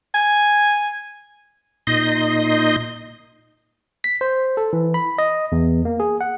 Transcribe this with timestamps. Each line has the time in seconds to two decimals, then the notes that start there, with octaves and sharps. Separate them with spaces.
0.15 G#5
1.87 A#2 D#4 D#5 C6 A#6
4.04 B6
4.21 C5
4.57 A4
4.73 E3
4.94 B5
5.18 D#5
5.52 E2
5.85 A#3
6.00 G#4
6.21 F#5